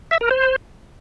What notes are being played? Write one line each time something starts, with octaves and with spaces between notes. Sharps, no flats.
E5
A#4
C5